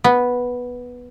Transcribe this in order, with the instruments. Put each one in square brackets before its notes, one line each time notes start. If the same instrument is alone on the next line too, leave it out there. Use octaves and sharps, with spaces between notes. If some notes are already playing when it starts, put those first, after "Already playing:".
[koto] B3